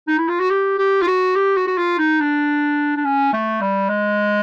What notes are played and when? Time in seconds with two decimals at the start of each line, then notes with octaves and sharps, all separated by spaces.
0.08 D#4
0.18 E4
0.28 F4
0.40 F#4
0.50 G4
0.78 G4
1.02 F4
1.07 F#4
1.35 G4
1.57 F#4
1.67 F#4
1.78 F4
1.98 D#4
2.20 D4
2.96 D4
3.05 C#4
3.33 A3
3.61 G3
3.89 G#3